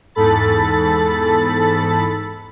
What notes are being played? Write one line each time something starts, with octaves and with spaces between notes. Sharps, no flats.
E2 G#2 A4 B5 A6